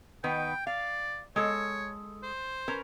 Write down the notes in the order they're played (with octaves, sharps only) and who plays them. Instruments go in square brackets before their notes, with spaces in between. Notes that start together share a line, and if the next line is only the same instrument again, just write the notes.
[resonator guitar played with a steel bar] D#3 B3 B4 [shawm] G5
[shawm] D5 [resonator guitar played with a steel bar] F5
[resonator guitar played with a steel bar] G#3 A4 [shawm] C#5
[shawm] C5
[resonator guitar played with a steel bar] C#4 A#4 B4